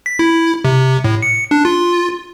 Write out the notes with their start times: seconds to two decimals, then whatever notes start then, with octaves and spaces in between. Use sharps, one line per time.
0.06 B6
0.19 E4
0.65 C3
1.04 A2
1.22 C#7
1.51 D4
1.65 F4